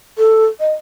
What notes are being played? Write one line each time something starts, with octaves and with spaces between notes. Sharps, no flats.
A4
D#5